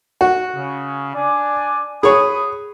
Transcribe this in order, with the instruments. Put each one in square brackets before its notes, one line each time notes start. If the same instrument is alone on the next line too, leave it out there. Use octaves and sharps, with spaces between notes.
[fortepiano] F#4
[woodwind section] C#3
D4 D5 G#5
[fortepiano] G#4 C#5 [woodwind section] F#5 B5 D#6